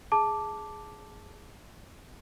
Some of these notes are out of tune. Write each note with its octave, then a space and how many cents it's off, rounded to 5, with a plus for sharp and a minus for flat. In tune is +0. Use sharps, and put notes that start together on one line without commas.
G#4 +0 A5 +0 D6 +0